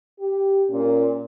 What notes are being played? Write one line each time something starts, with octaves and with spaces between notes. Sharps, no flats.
G4
A#2 C#4